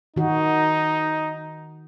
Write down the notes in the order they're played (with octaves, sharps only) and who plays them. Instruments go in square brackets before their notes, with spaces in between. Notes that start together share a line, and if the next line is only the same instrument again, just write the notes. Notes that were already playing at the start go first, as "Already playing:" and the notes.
[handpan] D#3 F#4 [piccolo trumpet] D#4